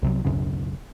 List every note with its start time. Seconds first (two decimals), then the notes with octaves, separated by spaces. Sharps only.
0.02 C2 C3 F#3
0.25 D1 B1 F#2 C#3